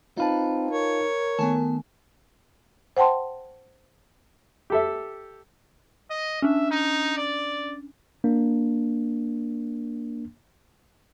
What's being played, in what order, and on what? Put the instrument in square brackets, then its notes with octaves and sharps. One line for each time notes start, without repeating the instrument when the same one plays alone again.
[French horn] C4 [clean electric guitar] D#4 B4 [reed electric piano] F4 F5 A5
[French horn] A#4 [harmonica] C#5
[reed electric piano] D#3 A3 [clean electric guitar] B3 G#5 A5
[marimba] C5 F#5 G5 A5 C6
[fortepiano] G4 A4 E5
[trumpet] D#5
[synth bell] C#4 D4 [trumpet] E5
[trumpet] D#4
D5
[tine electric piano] A#3 D4